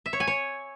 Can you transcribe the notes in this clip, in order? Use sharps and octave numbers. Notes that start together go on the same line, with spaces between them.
E5
C#5
G#5
C#5